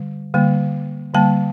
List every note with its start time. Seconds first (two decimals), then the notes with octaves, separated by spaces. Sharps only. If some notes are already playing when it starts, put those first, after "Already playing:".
Already playing: D3 G3
0.34 D3 G3 A#3
1.14 D3 G3 A#3 A5